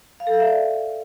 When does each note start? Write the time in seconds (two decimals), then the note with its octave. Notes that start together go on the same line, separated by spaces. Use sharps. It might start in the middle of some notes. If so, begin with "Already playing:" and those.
0.20 F5
0.27 A4
0.34 F5
0.40 E5
0.47 D5